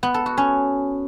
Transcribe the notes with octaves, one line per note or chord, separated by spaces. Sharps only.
B3
A4
F#4
C#4